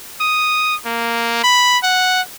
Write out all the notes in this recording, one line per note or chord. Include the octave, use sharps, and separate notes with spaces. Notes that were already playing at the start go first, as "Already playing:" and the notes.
D#6
A#3
B5
F#5